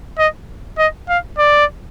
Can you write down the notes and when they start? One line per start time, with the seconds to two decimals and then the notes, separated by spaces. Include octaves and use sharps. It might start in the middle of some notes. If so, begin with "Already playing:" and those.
0.19 D#5
0.78 D#5
1.09 F5
1.38 D5